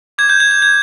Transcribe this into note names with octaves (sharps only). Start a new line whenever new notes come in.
D6 G6 G#6
G6
G#6
G#6
G#6